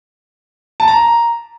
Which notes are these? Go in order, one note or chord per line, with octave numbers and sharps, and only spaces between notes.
A5
A#5